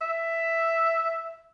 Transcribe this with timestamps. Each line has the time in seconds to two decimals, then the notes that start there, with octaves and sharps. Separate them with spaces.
0.01 E5